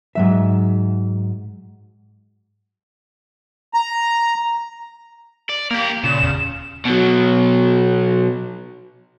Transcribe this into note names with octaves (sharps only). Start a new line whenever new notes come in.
G#2 F#3 E5
A#5
D5
A#3 G4 A#4
A#2 C#3 E7
E2
B2 F#3